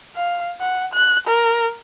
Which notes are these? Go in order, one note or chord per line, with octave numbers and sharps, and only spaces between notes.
F5
F#5
F#6
A#4